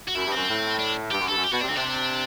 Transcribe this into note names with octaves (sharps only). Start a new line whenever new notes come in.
F#4
F#2 E4
G2
F#2 C4
A2
D4
G2 G4
F#2
G2 A4
F#2
G4
B2 F#4
C3 D4
D2 D3 C4
C3 D4